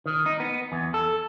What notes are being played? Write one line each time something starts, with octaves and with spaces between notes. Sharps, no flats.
D#3
D#4
B3
E2
A4